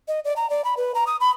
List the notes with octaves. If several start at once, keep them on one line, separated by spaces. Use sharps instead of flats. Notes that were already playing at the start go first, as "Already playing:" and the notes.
D#5
D5
A#5
D5
B5
B4
A#5
D#6
B5